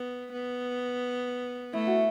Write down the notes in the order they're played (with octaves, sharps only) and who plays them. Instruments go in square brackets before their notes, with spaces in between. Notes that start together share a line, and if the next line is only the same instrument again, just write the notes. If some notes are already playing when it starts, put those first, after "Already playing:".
Already playing: [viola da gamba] B3
B3
[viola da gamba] A3 [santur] E4
[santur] F#4